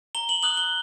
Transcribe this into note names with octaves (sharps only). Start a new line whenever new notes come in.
A#5 G7
F#7
D#6 F#6 F#7
G7